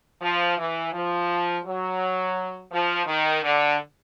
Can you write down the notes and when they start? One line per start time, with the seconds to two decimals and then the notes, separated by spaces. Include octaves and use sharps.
0.22 F3
0.58 E3
0.93 F3
1.65 F#3
2.72 F3
3.07 D#3
3.43 D3